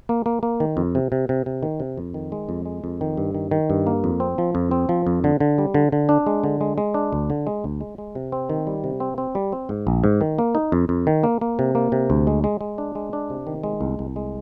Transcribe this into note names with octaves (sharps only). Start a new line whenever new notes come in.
A#3
A#3
A#3
D#3
F2
C3
C3
C3
C3
D#3
C3
F2
D#3
G#3
F2
G#3
F2
D#3
G2
D#3
D#3
G2
A#3
F2
C4
F3
F2
C4
F3
F2
D3
D3
G3
D3
D3
D4
G#3
D3
G#3
G#3
D4
D2
D3
G#3
D2
G#3
G#3
C3
C4
D#3
G3
C3
C4
C4
G3
C4
G#2
A#1
G#2
D#3
A#3
D#4
F2
F2
D#3
A#3
A#3
C3
A#3
C3
D2
G#3
G#3
G#3
D4
G#3
D4
C3
D#3
G#3
C2
C2
G#3